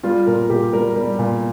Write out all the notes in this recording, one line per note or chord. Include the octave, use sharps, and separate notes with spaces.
G3 F4
A#2 A#4
A#2 G4
G3 A#4
G3
A#2